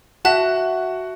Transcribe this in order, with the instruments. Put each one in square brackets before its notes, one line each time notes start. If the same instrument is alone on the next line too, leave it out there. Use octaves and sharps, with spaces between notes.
[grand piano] F#4 F#5 [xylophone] E5 A5 F#6